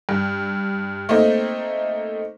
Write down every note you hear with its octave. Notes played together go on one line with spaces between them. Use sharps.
G2
A3 A#3 C4 D#4